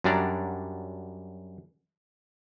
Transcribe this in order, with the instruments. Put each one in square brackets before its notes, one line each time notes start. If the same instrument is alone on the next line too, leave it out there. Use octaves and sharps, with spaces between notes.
[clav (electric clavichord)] F#2 F#3 G3 D4 D5 A#5